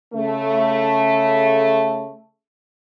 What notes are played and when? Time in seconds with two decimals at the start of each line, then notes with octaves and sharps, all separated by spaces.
0.13 C#3 A3